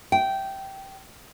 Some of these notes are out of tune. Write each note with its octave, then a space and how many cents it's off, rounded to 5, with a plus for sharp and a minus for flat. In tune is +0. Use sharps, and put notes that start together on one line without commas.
G5 -15